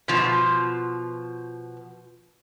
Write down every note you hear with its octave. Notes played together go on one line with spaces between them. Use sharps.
B2 F3